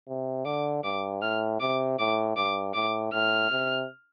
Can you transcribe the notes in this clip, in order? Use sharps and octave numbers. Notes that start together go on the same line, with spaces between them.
C3
D3 D6
G2 D6
A2 F6
C3 D6
A2 D6
G2 D6
A2 D6
A2 F6
C3